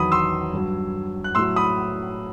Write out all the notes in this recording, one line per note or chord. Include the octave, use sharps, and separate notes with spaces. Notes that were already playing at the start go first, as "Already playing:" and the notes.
Already playing: E2 D#3 F#3 B5 D#6
C6 E6
G2 F#3
F#6
A2 F#3 C6 E6
B5 D#6